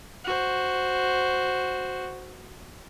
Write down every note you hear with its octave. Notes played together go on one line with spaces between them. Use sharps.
F#4 C5